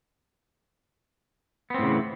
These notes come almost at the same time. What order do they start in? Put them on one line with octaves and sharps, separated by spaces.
B3 C4 A2 C#3 E3